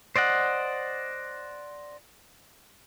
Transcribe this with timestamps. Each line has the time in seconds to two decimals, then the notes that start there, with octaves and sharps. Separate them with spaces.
0.16 C5 D5 D#5 F#5